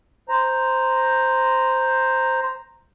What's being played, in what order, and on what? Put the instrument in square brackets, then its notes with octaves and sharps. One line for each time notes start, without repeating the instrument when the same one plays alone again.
[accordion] C5 A#5